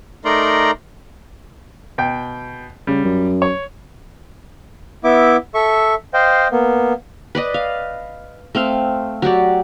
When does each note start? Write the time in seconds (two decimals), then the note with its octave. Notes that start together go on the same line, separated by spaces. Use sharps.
0.25 A3 D#4 A#4 D5 A#5 C6
1.98 B2 G5
2.87 C#3 G3
3.05 F#2
3.42 C#5
5.04 B3 E4 E5 D6
5.54 A4 E5 C#6
6.14 C5 D#5 F5 G5
6.51 A#3 B3
7.35 B4 D5 D#5
7.54 F5
8.55 A3 C4 F5
9.22 F#3 F#4 G4 D5